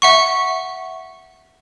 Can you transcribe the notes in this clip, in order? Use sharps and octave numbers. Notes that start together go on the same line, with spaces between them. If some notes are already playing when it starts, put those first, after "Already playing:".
E5 F#5 C#6